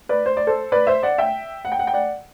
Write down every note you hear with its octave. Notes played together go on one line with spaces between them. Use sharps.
B4 D5
C5
D5
A4 C5
B4 D5
C5 E5
D5 F#5
E5 G5
F#5
G5
F#5
G5
D5 F#5